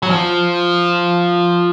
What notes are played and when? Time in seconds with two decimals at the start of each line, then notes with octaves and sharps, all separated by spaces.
0.03 F#3
0.11 F3